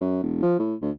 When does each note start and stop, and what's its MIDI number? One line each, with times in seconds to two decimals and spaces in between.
0.01 0.20 42
0.23 0.41 28
0.42 0.54 53
0.59 0.74 45
0.82 0.90 38